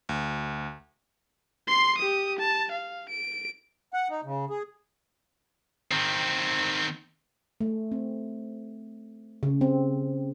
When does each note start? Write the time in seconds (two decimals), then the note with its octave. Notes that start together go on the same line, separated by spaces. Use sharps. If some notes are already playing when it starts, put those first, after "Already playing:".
0.09 D2
1.68 C6 C7
1.98 G4 D#6
2.39 A5
2.72 F5
3.10 D7
3.94 F#5
4.09 D#4
4.24 C#3
4.50 G#4
5.91 D#3 C4
7.61 A3
7.92 C4
9.43 C#3
9.61 C4